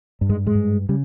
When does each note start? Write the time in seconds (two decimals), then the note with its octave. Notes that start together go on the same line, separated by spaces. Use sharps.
0.21 G2
0.29 G#2 G#3
0.46 G#2 G#3
0.55 G2
0.89 C#3 G3